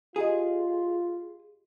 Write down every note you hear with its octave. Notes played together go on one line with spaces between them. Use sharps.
F4 G4 G#4 D#5